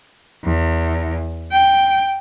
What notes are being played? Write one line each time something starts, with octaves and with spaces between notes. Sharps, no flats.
E2
G5